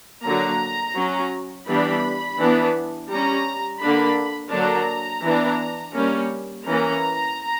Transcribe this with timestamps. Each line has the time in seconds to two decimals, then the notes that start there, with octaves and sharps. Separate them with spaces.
0.24 D3 F#3 A#3 A#5
0.96 F#3 C#4
1.67 E3 G3 B3 D4 B5
2.39 E3 B3 D4
3.10 G3 C#4 A#5
3.81 D3 A#3 D4 B5
4.52 D3 F#3 A#3 D4 A#5
5.24 E3 B3 D4
5.95 G3 A#3 C#4
6.67 E3 A#3 C#4 A#5